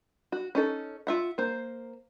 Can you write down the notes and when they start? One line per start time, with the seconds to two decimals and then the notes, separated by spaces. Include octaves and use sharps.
0.32 F#4
0.55 C#4 D#4 A4
1.07 F4 E5 F#5
1.38 A#3 C5